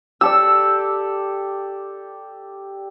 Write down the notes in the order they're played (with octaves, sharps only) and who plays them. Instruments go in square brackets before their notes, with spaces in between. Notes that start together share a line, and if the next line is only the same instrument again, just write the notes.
[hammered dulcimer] G4 A4 D5 [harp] E6